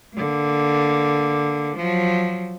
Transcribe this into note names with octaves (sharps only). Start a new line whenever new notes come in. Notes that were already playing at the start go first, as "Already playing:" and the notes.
D3 A#3
F3 F#3